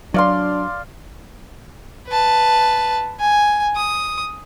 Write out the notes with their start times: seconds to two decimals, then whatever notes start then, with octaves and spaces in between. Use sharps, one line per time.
0.14 F#3 D4 D5 F5 C6
2.08 B4 A5
3.20 G#5
3.76 D#6